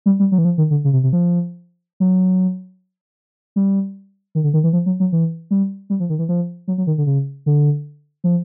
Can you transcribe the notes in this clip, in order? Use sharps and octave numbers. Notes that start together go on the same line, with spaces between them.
G3
G3
F#3
E3
F3
D#3
D3
C#3
C3
C3
F3
F#3
G3
D#3
D3
D#3
E3
F3
F#3
F#3
E3
G3
G3
F3
D#3
E3
F3
F#3
F#3
D#3
D3
C#3
D3
F3